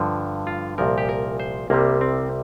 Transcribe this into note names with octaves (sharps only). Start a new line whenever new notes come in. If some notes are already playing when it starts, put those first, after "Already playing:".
Already playing: G2 D3 F3
F4
C2 A#2 F3 A#4
G4
A#4
C5
C2 C3 G3 A#3
C4